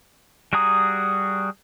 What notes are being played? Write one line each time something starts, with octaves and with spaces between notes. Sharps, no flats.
G3 F#4 G#4 A#5 D#6